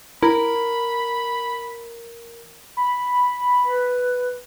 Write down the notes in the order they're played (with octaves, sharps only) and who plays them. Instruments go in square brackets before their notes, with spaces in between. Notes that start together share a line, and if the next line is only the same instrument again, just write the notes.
[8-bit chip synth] E4 [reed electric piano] A#4 [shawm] B5
[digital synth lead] B5
[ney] B4